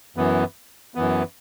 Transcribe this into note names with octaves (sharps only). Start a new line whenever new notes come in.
F#2 E3 B3
F#2 E3 B3